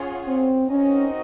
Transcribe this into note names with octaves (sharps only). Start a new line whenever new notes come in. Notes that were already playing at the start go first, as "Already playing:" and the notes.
Already playing: C#4 F4 G#4 C#5 F#5
C4
C4 C#4 D#4 F#4 A#4 D#5